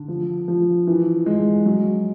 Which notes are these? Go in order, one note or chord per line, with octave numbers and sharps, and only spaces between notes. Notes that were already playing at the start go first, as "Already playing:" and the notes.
Already playing: D3
F3
F3
E3
G#3
F#3